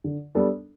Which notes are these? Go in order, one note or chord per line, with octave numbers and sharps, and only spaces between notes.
D3
G3 B3 D4 A4